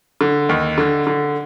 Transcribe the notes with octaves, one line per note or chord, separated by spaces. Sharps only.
D3
D#2
D3
D3